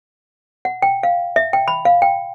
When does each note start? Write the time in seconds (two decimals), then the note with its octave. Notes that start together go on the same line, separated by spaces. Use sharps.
0.65 F#5
0.82 G5
1.03 F5
1.36 E5
1.53 G5
1.68 B5
1.85 F5
2.02 G5